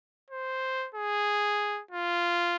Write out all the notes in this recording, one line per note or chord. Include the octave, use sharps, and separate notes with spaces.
C5
G#4
F4